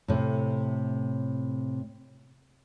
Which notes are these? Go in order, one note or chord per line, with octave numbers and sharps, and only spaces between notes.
A2 C3